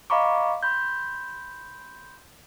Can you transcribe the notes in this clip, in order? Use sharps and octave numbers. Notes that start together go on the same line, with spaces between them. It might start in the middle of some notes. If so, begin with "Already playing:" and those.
D#5 F5 A#5 B5 C#6 D6
B5 C6 G6